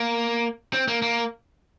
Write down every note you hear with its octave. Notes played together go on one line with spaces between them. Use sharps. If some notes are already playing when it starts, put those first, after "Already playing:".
Already playing: A#3
C4
A#3
A#3